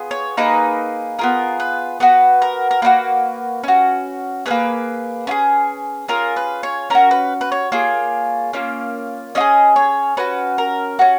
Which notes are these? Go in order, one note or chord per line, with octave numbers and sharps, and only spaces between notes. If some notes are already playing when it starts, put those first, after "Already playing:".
Already playing: B3 F4 G#4
C#5
A#3 D#4 G#4 B4
B3 F4 G#4 A#4
B4
B3 F#4 B4
A#4
A#4
A#3 D#4 F#4 B4
C#4 F#4
A#3 C#4 G#4 B4
C#4 F4 G#4
C#4 F4 G#4 A#4
B4
C#5
C#4 F#4 A#4
B4
B4
C#5
A#3 F4 G#4 C#5
A#3 C#4 F4
C#4 F4 D#5
G#4
C#5
C#4 F#4 B4
A#4
C#4 F#4